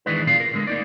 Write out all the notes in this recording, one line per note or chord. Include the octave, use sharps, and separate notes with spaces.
D#3 E3 G#3 D4 E4 B4
B1 A#2 B3 D4 F4 F5
A#4
D3 G#3
A#3 D#4 D5